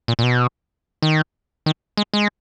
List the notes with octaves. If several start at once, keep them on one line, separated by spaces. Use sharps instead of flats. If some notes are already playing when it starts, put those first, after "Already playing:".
A#2
A#2
B2
D#3
D#3
G#3
G#3